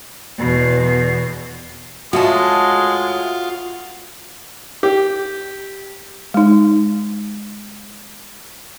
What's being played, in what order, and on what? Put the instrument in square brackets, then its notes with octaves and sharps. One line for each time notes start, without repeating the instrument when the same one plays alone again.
[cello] E2 B2
[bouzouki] A2 D#5 A5 [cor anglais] G#3 [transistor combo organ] F4 [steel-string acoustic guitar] F#4
[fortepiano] G4
[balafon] G#3 D#4